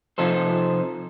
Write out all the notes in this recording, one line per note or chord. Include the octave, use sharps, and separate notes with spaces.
C3 F3 D#4 A4 C5